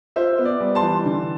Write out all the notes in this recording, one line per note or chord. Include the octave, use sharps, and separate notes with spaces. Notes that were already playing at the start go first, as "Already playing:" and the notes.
F4 C5 E5
B3
D5
G3
A5 C6
E3
D3